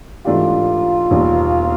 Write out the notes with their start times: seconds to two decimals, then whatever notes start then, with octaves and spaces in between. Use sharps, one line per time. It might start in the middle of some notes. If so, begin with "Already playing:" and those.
0.25 G#2 E3 A3 D4 F4 G4
1.11 E1 D#2 D#3 G3